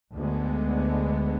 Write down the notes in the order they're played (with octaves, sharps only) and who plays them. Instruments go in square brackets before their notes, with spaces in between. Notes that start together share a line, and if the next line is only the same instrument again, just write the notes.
[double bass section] D2 D3 G#3 B3